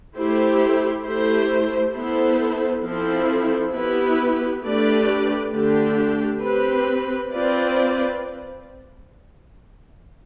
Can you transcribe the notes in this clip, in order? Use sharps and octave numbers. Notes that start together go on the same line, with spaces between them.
A3 E4 G4 C5
A3 E4 G4 C5
B3 E4 A4 C5
F3 C4 E4 A4 C5
B3 E4 G4 B4
A3 D4 G4 B4 D5
D3 A3 D4 G4
C4 G4 B4
C4 F4 B4 D5